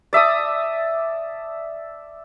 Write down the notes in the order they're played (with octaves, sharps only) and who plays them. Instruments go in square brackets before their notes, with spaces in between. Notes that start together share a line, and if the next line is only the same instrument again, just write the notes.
[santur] D5 E5 A5 D#6